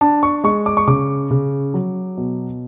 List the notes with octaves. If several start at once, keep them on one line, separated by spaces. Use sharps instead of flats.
D4 A5
C#6
G#3 C#6
D6
C#6
C#3 D6
C#3
F#3
B2